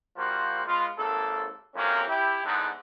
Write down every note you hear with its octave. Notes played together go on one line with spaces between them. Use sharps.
F3 G3 A#3 F#4 C5
G#3 B3 F4
G#1 D#2 A#3 A4
F2 C3 F#3 A#3 C#4
E4 G4
E2 G#2 D3 B3 D#4